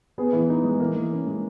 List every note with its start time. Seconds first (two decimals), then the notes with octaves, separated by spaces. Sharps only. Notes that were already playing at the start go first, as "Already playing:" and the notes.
0.18 B3 G#4
0.33 E3
0.49 D#4
0.64 G#3
0.79 E3 A#3
0.96 E3
1.11 C#4
1.27 G#3